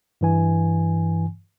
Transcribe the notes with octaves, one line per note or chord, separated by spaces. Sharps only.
G2 E3 G#5